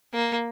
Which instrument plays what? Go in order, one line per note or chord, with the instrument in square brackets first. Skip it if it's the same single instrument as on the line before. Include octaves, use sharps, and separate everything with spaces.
[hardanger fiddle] A#3